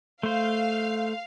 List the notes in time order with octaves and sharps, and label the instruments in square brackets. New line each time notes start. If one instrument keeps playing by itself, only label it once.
[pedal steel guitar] A3 C5 [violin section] F5